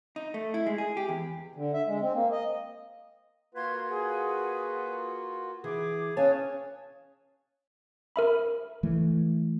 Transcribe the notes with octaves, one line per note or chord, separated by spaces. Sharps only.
D#4
A3
E4
G#3
G#4
G4
E2
D3
E5
G#3
C4
A#3
D#5
A#3 F4 F#4 B4 F5 C6 G#6
G#4 F#5
E3 G#4 D6
C#4 C#5 F5 G#5 A5 D#6 F#6
A#4 E5 B5
E3 A3